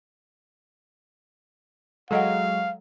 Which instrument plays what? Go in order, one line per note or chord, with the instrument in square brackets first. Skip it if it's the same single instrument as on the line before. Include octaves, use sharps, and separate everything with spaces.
[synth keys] F#3 G#3 [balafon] A4 D#5 F#5 [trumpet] F5